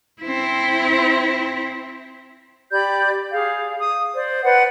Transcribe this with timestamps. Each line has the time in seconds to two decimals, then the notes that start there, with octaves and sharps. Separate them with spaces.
0.22 C4 E4
2.72 G4 D5 B5 G6
3.31 G#4 F5
3.80 D#6
4.14 C5 D5
4.44 B4 C5 D5 F#5